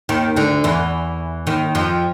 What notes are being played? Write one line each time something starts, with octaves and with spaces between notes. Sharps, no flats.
D#2 D#3
D2 D3
E2 E3
D#2 D#3
F2 F3